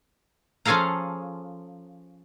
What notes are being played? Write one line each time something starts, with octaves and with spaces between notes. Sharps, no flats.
F3 C#4 G#4 A4 F5 A#5